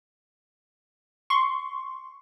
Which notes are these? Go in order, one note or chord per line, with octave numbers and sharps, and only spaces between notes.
C6 C#6